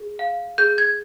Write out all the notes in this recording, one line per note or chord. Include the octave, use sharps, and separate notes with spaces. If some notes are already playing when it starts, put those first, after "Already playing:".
Already playing: G#4
F5
G#4 G6
G#6